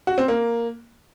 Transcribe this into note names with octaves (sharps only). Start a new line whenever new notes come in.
F#4
C4
A#3